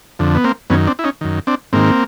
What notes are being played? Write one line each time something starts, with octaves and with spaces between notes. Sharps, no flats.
F2 D3
B3
A#3 C4
F#2 D#3 B3 C#4
C4 D4
E4
C#4 D#4
F#2 D#3
C4 D4
G#2 D#3 A#3 C4